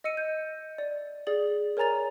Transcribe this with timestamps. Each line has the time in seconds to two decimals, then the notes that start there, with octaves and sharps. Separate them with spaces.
0.04 D#5 E6 C#7 D#7
0.17 G6
0.78 D5
1.27 G#4 D5 A6 F#7
1.77 A#4 C#5 G#5 A#5 A6 F7